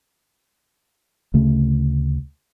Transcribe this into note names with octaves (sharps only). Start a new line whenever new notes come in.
D2 C#3 A3